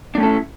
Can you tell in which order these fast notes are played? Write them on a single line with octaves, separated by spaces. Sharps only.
D4 A3 C#4 A4 E4